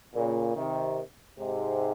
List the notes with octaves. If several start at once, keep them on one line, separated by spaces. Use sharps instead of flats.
A#2 C#3
C3 D#3
G#2 C3